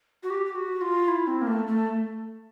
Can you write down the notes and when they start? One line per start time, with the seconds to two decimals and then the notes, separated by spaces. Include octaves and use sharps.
0.23 F#4
0.30 G4
0.46 G4
0.55 F#4
0.81 F4
1.08 E4
1.27 C4
1.42 A#3
1.47 A3
1.67 A3